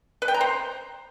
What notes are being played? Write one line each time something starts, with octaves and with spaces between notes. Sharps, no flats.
B4
G5
A#5
C5